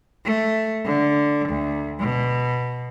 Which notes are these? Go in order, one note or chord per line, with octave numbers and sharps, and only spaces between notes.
A3
D3
D2
B2